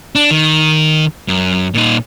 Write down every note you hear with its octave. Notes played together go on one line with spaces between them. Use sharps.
D4
D#3
F#2
A#2 D#4